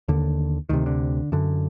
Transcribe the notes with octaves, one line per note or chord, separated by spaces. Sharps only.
D#2 D3
D2 C3 D#3
D3
F#2 D3